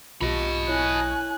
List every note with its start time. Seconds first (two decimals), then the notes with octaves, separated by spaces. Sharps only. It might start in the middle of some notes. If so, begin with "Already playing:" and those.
0.21 B1 F4 G4 D#5 B5 C#6
0.68 E4 C#5 G#5 F#6